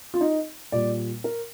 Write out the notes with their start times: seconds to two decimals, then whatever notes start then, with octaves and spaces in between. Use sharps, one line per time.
0.14 F4
0.21 D#4
0.72 A#2 G3 D5
1.24 A#4